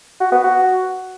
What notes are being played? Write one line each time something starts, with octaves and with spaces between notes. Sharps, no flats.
F#4
B3
F#4